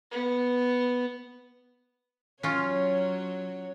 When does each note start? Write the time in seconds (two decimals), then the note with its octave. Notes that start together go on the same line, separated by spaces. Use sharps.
0.12 B3
2.43 F#3 C#4 F4 C#5